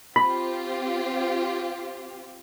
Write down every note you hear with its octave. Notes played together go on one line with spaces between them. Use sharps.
C4 F4 G4 B5